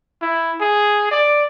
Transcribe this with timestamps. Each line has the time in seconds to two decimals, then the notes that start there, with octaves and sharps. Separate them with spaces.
0.22 E4
0.61 G#4
1.11 D5